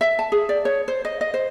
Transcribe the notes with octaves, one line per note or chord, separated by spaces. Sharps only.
E5
A5
G#4
D5
C#5
C5
D#5
D#5
C5